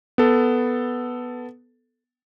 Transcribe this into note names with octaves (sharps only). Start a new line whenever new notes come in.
B3 A4